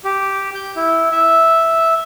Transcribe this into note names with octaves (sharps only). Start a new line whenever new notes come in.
G4
G6
E4
E5